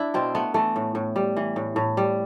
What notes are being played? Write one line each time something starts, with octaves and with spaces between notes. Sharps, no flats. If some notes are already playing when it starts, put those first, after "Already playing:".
Already playing: D4 E4
B2 C4
A3 B3
E3 A3
A2
A2
G3
E3
A2
A2
G3